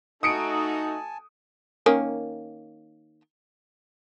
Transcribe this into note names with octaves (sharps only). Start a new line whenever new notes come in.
A3 D#4 F#4 G#5 A5 D#6 C#7 D7
D#3 A#3 C#4